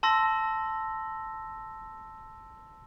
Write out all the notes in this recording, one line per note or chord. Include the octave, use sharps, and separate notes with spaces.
A5 C6 E6 A#6